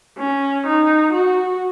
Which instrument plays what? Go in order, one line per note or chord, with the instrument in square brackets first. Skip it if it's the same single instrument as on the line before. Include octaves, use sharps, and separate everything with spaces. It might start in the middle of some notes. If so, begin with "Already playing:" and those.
[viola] C#4
D#4
F#4